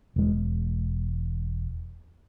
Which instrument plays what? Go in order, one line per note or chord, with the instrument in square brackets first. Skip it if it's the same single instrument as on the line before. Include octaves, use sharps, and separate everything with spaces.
[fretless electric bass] E1 G#3